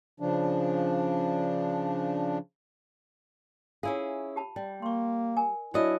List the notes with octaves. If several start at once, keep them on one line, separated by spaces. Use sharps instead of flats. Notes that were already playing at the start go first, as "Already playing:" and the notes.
C#3 F3 D4
C#4 E4 F4 G#4 F5
G4 A5 B5
G3
A#3 C6 C#6
A#4 G#5
F#3 D4 E4 D#5